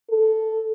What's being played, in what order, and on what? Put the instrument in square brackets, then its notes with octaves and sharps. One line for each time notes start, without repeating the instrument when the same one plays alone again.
[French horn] A4